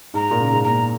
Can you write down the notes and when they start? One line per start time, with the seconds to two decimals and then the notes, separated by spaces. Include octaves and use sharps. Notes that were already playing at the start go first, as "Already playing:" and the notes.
0.14 G#2 A#5
0.31 A#2
0.39 C#3
0.52 G#2
0.64 A#2 A#5